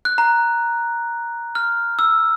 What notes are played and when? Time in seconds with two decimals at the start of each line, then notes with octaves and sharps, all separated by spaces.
0.05 F#6
0.18 A#5
1.55 F6
1.99 E6